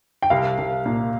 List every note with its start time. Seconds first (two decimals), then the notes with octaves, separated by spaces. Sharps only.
0.22 G5
0.30 C2 F5
0.58 C2
0.86 A#2